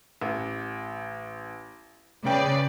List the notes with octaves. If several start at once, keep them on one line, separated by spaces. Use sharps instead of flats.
A1
C#3 B4 D5 G5